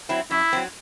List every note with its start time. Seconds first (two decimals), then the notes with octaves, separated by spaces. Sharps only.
0.09 F#3 C4 E4
0.31 F#2 E4
0.53 F#3 C4